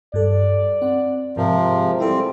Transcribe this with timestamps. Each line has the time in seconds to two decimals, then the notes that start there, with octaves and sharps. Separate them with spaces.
0.14 G2 A4 D5
0.82 C4 F#5
1.37 G#2 C3 F3 A#4
1.69 G#3
2.00 G3 C4 E4 A4